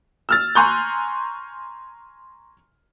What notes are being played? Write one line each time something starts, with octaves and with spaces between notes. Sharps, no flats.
E6 F6 A6
G#5 A#5 C6 C#6 F#6 G6